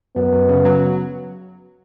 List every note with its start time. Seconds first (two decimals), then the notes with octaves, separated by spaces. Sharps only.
0.16 F#2 B3
0.33 F#2
0.49 C#3
0.65 F#3